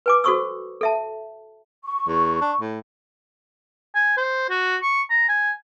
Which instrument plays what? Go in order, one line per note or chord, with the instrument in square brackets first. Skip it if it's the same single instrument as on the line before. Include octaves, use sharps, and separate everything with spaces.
[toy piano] B4 G#5 D6
F#4 A4 C5 C#6 D#6 E6
A4 E5 A5
[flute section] C#6
[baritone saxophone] E2
D4
A2
[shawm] G#5
C5
F#4
C#6
A#5
G#5